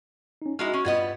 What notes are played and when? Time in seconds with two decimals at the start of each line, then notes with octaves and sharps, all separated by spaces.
0.42 C#4 D#4
0.59 G#3 D#4 E4 F#4 F6
0.73 C#4
0.85 G2 G3 B3 F4 D#5 G#6